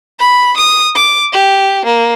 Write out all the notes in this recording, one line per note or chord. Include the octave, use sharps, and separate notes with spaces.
B5
D#6
D6
G4
A#3